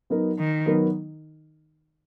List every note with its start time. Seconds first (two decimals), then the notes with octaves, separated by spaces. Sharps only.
0.10 F#3 B3 D#4 A#4
0.38 D#3
0.66 F#3 B3 D#4 A#4